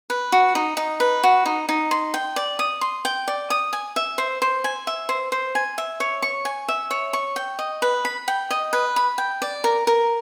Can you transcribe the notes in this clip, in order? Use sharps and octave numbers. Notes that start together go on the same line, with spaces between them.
B4
F#4
D#4
D#4
B4
F#4
D#4
D#4
C6
G5
D5
D#6
C6
G5
D5
D#6
G#5
E5
C5
C5
G#5
E5
C5
C5
G#5
E5
C#5
C#6
G#5
E5
C#5
C#6
G5
D#5
B4
B5
G5
D#5
B4
B5
G5
D5
A#4
A#4